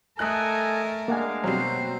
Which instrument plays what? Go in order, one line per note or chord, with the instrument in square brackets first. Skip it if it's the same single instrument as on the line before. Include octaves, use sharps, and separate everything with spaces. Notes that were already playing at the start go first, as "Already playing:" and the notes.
[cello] A3 A#4 [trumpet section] A4 D#5 G#5 [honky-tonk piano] D#6 F#6
[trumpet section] G#3 D4 F5 [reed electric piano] A#3 F#5 G#5
[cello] B2 C5 [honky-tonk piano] F#3 G3 C4